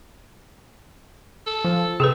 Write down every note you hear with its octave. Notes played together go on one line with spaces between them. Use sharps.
A4
F3
C3 G#4 A4 B4